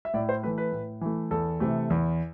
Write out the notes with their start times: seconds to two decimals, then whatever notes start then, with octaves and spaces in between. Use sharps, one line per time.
0.05 E5
0.14 A2 D5
0.29 C5
0.43 E3 A3 B4
0.58 B4
0.72 A2
1.01 E3 A3
1.31 E2 A4
1.60 C3 E3 A3
1.90 E2